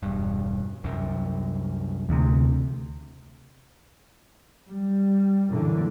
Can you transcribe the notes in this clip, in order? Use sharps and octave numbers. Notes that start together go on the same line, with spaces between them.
E1 G2
C2 F#2
D2 C3
G3
F#2 A#2 D3 E3